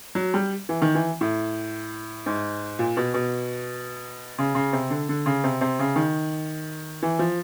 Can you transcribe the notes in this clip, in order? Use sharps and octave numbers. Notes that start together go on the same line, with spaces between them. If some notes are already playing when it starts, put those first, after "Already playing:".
F#3
G3
E3
D#3
E3
A2
G#2
A#2
B2
B2
C#3
C#3
C3
D3
D3
C#3
C3
C3
C#3
D#3
E3
F3